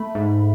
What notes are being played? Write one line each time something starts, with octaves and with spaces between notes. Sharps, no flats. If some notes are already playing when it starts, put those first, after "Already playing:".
Already playing: A3 B5
G#2